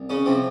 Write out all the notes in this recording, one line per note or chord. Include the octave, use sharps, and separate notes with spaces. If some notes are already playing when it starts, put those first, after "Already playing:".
Already playing: C2
C#3 C#4
C3 F3 C4